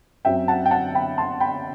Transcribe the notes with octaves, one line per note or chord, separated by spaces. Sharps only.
F#2 F#3 C4 E5 G5
F#5 A5
G5
F#5 A5
G5 B5
A5 C6
G5 B5